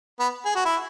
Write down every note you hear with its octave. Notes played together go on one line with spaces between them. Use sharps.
B3
G#4
F#4
E4